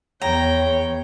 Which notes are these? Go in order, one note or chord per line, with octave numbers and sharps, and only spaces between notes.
E2 C#5 G5 A#5